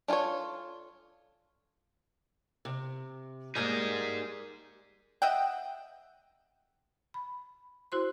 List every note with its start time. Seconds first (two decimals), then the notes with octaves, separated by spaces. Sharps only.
0.08 D4 F4 G#4 A4 C#5
2.65 C3
3.55 G3 G#3 A#3 D#4 G#4
5.22 D#5 E5 F#5 G5
7.14 B5
7.92 E4 F#4 C5 C6